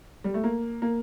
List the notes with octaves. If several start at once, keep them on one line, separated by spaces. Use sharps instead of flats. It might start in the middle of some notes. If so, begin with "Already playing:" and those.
G3
A3
A#3
A#3